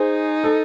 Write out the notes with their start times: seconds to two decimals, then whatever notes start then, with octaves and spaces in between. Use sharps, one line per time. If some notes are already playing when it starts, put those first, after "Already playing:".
Already playing: D#4 G#4 C5
0.44 A4